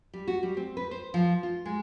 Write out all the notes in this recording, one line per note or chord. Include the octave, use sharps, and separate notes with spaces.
G3
F#4
G3
C4
B4
C5
F3
F4
G#3